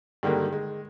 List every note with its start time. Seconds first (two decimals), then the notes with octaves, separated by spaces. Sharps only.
0.23 G2 D3 D#3 G#3 A#3
0.53 G#3